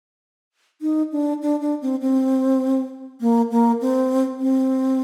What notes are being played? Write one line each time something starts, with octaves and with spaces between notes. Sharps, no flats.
D#4
D4
D4
D4
C4
C4
A#3
A#3
C4
C4